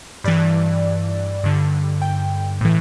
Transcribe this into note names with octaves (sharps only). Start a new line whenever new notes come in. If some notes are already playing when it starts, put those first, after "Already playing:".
G2 E3 D5
G2 D3
G5
A2 E3